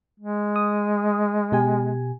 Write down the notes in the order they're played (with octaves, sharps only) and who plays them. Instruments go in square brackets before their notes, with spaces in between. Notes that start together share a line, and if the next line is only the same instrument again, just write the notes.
[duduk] G#3
[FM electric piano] D#6
B2 G4 G#5